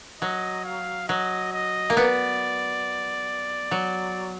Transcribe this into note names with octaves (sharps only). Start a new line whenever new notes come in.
F#3 D#5
F5
F#3 D#5
D#5
A#3
B3 D5
F#3